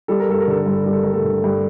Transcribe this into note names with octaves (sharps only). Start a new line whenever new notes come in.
G3 A4
A#4
G2 A4
A#4
D3 A4
A#4
G2
A4
G3 A#4
A4
G2 A#4
A3 A4
D3
G2